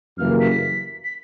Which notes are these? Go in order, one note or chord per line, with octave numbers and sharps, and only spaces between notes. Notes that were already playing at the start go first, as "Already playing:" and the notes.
F#2 C#3 E3 G3 A#3 F6
B6
B6